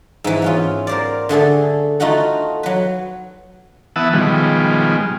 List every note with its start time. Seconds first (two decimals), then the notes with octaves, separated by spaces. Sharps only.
0.24 G#2 E3
0.42 B3 C#4 F4
0.87 A#4 C5 D5
1.29 D3 A3 G#4 A4
2.00 A3 D#4 F4 F#4 F#5
2.63 F#3 B4
3.96 E3 B3 E5 F#5 A5 D#6
4.13 B2 D#3 F3 G3 G#3